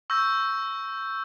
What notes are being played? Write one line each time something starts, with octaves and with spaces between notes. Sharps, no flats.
C#6 E6 G6 A#6